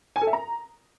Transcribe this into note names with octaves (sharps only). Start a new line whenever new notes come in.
G#5
A4
E5
A#5